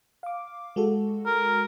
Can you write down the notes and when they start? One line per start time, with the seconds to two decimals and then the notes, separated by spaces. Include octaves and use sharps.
0.23 F5 D6
0.76 G#3 F#4 A4
1.26 A#4